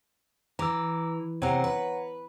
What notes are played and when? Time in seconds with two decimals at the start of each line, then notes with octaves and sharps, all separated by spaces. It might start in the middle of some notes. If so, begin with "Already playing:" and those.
0.59 E3 A#5 D6 E6
1.42 C3 C4 C#5 F#5 A#5
1.64 B4